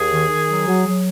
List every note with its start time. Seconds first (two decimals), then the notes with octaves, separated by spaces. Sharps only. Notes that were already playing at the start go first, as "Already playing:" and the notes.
Already playing: D#2 G#4
0.11 D#3
0.29 D#3
0.49 F#3
0.67 F#3
0.85 F#3